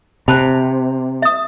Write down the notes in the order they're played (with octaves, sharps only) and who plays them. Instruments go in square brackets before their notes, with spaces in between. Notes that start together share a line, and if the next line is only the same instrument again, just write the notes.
[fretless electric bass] C3 [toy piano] C5 A5 B5
[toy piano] E5 D#6